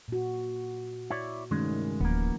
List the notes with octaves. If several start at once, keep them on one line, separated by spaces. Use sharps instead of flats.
A#2 F#4
E4 C#5 D5
C2 G2 D#3 G#3 A3 C#4
D1 F3 A#3 B3